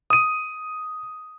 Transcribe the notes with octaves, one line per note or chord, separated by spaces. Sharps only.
D#6 D#7